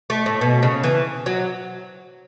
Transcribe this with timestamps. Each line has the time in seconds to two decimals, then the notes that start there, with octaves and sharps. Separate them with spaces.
0.10 A3
0.26 A2
0.41 B2
0.62 C#3
0.83 E3
1.26 F#3